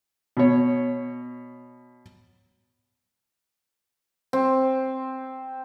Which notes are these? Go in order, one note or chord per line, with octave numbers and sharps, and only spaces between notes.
B2 C#5
C4